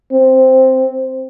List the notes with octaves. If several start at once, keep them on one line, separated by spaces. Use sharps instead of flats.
C4